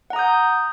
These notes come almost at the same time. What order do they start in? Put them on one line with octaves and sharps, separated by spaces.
F#5 A#5 D#6 G6